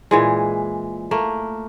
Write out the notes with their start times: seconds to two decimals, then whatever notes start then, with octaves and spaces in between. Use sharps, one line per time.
0.11 A#2 E3 G#3
1.11 A3 A#3 A#4